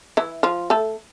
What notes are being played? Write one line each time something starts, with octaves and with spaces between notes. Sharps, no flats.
E3 E4
F3 F4
A3 A4